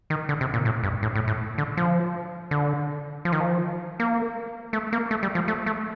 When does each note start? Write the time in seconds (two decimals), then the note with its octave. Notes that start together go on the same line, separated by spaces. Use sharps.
0.10 D#3
0.29 D3
0.41 C3
0.54 A#2
0.65 A2
0.84 G2
1.03 A2
1.15 A2
1.27 A2
1.58 D3
1.77 F3
2.51 D3
3.25 F3
3.32 D#3
3.41 F3
4.00 A#3
4.73 A3
4.93 A#3
5.11 A3
5.23 G3
5.35 F3
5.48 A3
5.66 A3